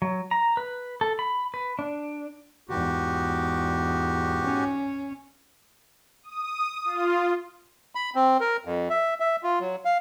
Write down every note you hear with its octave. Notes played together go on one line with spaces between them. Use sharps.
F#3
A#5
B4
A4
B5
B4
D4
E2 G#2 F#4 G4
C#4
D#6
F4
B5
C4
A#4
F2
E5
E5
F4
F#3
F5